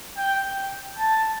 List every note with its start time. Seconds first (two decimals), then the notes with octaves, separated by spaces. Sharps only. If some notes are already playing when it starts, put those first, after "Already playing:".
0.18 G5
0.98 A5